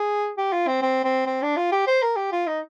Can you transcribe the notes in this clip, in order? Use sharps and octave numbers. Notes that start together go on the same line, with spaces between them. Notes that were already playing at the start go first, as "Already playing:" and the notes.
Already playing: G#4
G4
F4
C4
C4
C4
C4
D4
F4
G4
C5
A#4
G4
F4
D#4